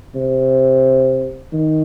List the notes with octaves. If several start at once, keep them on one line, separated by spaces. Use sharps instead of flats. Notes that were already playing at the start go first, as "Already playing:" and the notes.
C3
D#3